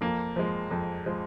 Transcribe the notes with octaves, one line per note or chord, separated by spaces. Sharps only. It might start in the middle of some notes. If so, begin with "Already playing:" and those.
F2 A#3
F3 G#3
F2
F3 G#3